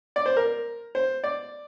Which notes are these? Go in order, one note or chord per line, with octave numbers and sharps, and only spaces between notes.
D5
C5
A#4
C5
D5